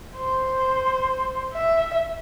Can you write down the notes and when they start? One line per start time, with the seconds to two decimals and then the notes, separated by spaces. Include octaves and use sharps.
0.18 C5
1.53 E5